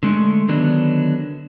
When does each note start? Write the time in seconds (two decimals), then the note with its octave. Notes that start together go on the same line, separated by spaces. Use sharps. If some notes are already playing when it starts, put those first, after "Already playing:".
0.03 D3 G#3 A3
0.48 D3 D#3 F#3 B3 D4